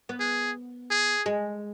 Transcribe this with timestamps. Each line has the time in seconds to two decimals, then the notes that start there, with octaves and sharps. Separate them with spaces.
0.09 B3
0.20 G#4
0.91 G#4
1.26 G#3